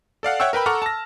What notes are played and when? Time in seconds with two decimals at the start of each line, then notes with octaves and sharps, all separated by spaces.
0.23 A4 D5 F5 F#5
0.40 C#5 E5 F#5 G5 C#6 E6
0.53 A#4 B4 G5 B5
0.66 A4 F#5 A#5 C#6 D6 F6
0.82 A5 A#6